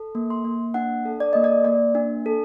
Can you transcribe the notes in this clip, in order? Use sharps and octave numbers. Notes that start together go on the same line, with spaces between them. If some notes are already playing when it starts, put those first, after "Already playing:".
Already playing: A4
A#3
C6
A#3
D4 F#5
A4
D5
A#3 D#5
D5
A#3 D5
D4
A4